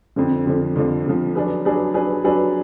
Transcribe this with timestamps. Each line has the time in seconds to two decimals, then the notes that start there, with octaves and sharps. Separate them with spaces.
0.16 F2 D3 F3
0.46 F2 D3 F3
0.75 F2 D3 F3
1.06 F2 D3 F3
1.35 F#3 D4 G#4 B4
1.65 F#3 D4 G#4 B4
1.94 F#3 D4 G#4 B4
2.24 F#3 D4 G#4 B4